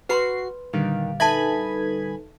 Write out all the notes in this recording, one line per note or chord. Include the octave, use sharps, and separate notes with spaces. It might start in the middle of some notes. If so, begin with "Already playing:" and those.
F#4 B4 B5 C6 C7
A#2 D3 D#3 G3 F5
D#4 A4 B4 E5 G#5 A5 B5 G#6